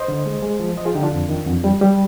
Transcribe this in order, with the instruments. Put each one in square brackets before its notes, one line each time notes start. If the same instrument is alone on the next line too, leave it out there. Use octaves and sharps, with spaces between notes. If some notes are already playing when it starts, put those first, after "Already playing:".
Already playing: [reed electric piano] C5 D#5
D3
G#3
G#3
F3
F3 C5 D#5
F4 G#4
D3 D#4 G4
D4 F4
F2
D#3
F2
G3
G3